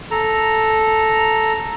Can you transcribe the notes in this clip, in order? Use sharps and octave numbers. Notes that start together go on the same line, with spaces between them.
A4 A#5